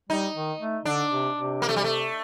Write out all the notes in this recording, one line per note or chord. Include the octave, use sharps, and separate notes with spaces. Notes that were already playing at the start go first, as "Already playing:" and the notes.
G3 D#4
D#3
A3
D3 D4
C3
C3
A#3
A3
G3
A3